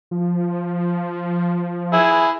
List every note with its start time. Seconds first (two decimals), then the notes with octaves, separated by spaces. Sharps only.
0.11 F3
1.93 E4 G#4